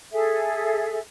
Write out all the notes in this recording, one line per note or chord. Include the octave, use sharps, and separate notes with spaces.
G#4 A4 E5